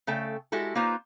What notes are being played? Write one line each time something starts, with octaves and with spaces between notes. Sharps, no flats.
C#3 A3 A4 G5
G#3 E4 F#4 G4 A4
A#3 D#4 F4 B4 C5